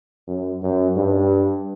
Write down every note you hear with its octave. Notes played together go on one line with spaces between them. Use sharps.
F#2
F#2
G2